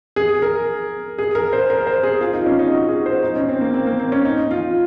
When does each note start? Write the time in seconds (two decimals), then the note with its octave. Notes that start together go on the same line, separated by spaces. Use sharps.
0.16 G#4
0.42 A#4
1.18 G#4
1.35 A#4
1.53 C5
1.70 A#4
1.87 C5
2.03 G#4
2.21 F4
2.34 D#4
2.46 C#4
2.59 D#4
2.72 F#4
2.88 G#4
3.06 C5
3.23 D#4
3.36 C#4
3.49 C4
3.61 A#3
3.74 C4
3.87 A#3
3.99 C4
4.12 C#4
4.25 D#4
4.51 F4